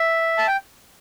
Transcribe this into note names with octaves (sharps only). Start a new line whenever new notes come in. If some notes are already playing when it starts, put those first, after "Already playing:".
Already playing: E5
A5
G5